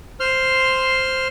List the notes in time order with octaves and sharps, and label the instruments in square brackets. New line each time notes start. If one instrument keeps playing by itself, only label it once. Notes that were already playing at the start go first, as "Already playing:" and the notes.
[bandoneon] C5 C6 F6